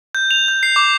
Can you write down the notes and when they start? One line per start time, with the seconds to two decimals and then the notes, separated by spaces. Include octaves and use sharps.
0.15 G6
0.31 F7
0.48 G6
0.63 C7
0.76 D6